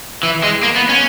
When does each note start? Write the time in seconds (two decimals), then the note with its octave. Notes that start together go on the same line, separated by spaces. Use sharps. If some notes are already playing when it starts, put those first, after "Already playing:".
0.23 E3
0.43 G#3
0.63 A#3
0.76 B3
0.89 C#4